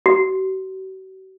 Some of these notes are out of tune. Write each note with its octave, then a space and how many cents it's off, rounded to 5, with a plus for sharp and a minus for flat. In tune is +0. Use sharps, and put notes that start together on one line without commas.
F#4 +45